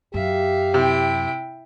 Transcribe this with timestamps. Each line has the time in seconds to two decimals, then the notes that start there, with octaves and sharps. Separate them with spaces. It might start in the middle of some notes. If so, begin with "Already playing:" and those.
0.14 F#2 G4 E5 F5
0.74 C3 E4 G5